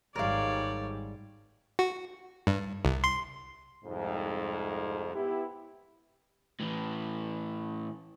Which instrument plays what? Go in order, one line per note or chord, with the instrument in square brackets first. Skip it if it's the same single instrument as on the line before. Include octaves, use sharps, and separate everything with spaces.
[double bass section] G#1 G#2 G3 [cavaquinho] A#4 F5 [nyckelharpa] C#5 D5
[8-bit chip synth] F#4
G2
C2
C6
[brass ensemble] C2 F2 G#2
B3 E4 G4
[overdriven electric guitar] A2 E3